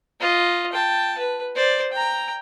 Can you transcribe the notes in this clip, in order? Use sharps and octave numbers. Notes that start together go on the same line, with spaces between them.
F4 D#5
G5 A5
B4
C5 D5
G5 A#5